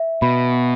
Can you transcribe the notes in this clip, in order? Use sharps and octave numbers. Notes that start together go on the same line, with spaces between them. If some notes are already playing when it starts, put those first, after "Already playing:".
Already playing: E5
B2 B5